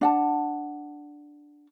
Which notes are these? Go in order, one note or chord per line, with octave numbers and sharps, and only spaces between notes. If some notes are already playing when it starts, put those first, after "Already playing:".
D4 F#5 A5